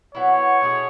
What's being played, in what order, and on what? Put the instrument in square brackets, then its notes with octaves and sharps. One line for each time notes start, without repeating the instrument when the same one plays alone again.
[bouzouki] F#3 B3 E4 B4 [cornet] C#5
[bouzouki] B2 A3 C#4 G#4